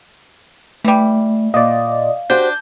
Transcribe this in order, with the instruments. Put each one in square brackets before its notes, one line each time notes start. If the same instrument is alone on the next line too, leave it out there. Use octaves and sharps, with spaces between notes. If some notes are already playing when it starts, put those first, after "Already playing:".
[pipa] E3 G3 [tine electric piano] A3
[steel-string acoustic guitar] A#2 [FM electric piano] D5 D#5 [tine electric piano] F5
[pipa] D4 [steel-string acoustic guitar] F#4 G4 C5 [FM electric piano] G6